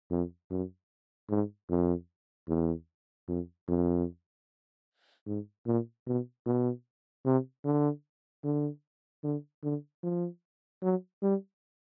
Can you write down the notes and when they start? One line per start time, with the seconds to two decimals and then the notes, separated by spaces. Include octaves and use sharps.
0.11 F2
0.50 F#2
1.30 G#2
1.69 F2
2.48 E2
3.28 F2
3.68 F2
5.26 G#2
5.66 A#2
6.06 B2
6.46 B2
7.25 C3
7.65 D3
8.44 D3
9.23 D3
9.63 D3
10.03 F3
10.82 F#3
11.22 G3